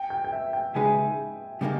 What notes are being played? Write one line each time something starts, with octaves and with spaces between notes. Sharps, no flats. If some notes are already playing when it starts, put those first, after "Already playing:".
Already playing: G5
G5
G5
E5
G5
C#3 G#3 D#4 G#4 B4 G#5
C#3 G3 A#3 D#4